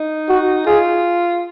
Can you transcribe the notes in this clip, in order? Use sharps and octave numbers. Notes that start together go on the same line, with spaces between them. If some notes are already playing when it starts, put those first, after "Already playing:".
Already playing: D#4
F#4
F4 G#4